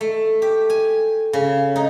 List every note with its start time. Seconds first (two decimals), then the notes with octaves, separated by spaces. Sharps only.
0.01 A3
0.42 G4
0.70 G#5
1.33 C#3
1.76 D#4